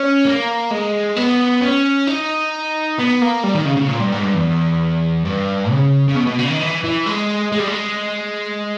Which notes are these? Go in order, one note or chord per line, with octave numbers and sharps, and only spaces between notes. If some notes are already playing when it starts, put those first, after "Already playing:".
Already playing: C#4
A#3
G#3
B3
C#4
D#4
B3
A#3
G3
D#3
C#3
C#3
A#2
G2
G#2
G2
E2
G2
C#3
C#3
B2
B2
C#3
D#3
E3
E3
G#3
G#3
G3
G#3